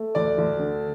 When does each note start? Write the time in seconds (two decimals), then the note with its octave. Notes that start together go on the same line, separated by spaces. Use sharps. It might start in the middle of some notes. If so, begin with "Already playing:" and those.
Already playing: A3
0.15 D2 D5
0.38 D2
0.59 D3